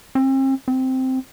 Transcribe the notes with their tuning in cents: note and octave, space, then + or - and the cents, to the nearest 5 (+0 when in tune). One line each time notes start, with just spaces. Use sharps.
C4 +40
C4 -5